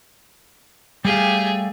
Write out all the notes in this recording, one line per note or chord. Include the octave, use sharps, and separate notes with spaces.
G3 A3 G4 G#4 F5